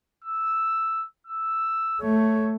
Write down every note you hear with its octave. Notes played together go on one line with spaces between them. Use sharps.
E6
E6
A3 C#5